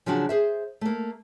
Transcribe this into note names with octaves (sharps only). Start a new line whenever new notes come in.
C#3 F3 F#3 D4 F#4
G#4 C5 E5
A3 A#3